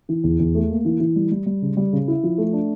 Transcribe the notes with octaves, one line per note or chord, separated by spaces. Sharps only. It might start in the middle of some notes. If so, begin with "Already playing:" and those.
E3
E2
E2
A3
A#3
E3
E3
G3
G3
G3
C#3
G3
C#3
E4
F3
A3
D4